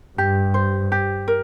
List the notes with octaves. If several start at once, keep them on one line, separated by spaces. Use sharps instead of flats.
G2 G4
C5
G4
A#4